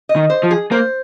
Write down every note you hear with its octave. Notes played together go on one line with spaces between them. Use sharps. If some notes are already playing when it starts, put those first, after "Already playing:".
D#5
D#3
C5
F3
G#4
A#3 C5